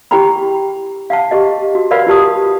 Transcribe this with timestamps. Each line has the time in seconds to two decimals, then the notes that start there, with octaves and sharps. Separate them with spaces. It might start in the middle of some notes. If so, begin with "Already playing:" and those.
0.11 E4 G4 G#4 G5 A#5 B5
1.10 F5 F#5 A5
1.31 G4 G#4 D#5
1.75 F#4
1.91 A#4 B4 D5 F5 F#5 B5
2.07 F4 G4 A5 D#6